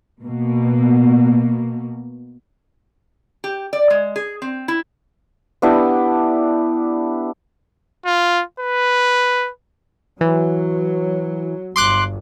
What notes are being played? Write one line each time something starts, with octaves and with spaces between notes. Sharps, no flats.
B2 A#3
G4
D5
G#3
G#4
C4
E4
B3 D4 E4 G4
F4
B4
E3 F#3
G1 C6 D6 F#6